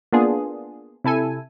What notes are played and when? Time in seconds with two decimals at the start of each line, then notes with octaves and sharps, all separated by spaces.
0.13 A#3 B3 D4 F4 G#4
1.04 C3 E4 A4 G#5